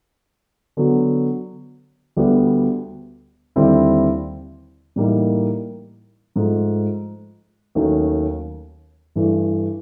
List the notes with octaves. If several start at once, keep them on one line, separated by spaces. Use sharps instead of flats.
D3 F#3 B3
D2 D3 G3 B3
D#2 D3 G3 C4 E4
A2 E3 G3 A#3 D#4
G#2 F3 A3
D#2 D#3 F#3 A3 C#4
G2 E3 A3